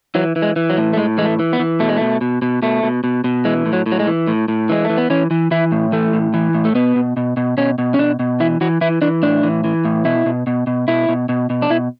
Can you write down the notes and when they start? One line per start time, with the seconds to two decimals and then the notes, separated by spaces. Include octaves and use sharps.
0.15 E3 F#3
0.36 E3
0.42 G#3
0.56 E3
0.70 F#3
0.77 A2
0.93 A3
0.97 A2 G#3
1.18 E3 G#3
1.25 A3
1.39 E3
1.53 B3
1.59 E3
1.80 B2 A3
1.89 G#3
1.97 B2 A3
2.21 B2
2.42 B2
2.62 B2 A3
2.83 B2
3.04 B2
3.24 B2
3.45 E3 G#3
3.66 A2
3.73 F#3
3.86 A2
3.92 F#3
3.99 G#3
4.07 E3
4.27 A2
4.48 A2
4.69 E3 G#3
4.85 A3
4.90 E3
4.98 B3
5.10 E3 C#4
5.31 E3
5.51 E3 E4
5.72 A2
5.92 E3 A3
6.13 A2
6.34 E3
6.54 A2
6.65 A3
6.75 B2 B3
6.96 B2
7.17 B2
7.37 B2
7.57 B2 C#4
7.78 B2
7.94 C#4
7.99 B2 D4
8.19 B2
8.40 E3 E4
8.61 E3 F#4
8.81 E3 E4
9.02 E3 D4
9.23 A2 D4
9.43 E3
9.64 E3
9.85 A2
10.05 B2 E4
10.26 B2
10.47 B2
10.67 B2
10.88 B2 E4
11.09 B2
11.29 B2
11.50 B2
11.62 D4
11.70 B2 E4